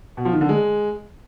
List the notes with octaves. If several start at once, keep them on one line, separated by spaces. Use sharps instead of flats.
B2
F3
D#3
D3
G#3